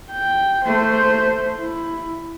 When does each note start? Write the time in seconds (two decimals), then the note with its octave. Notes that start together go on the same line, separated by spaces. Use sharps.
0.11 G5
0.65 A3 C5
1.59 E4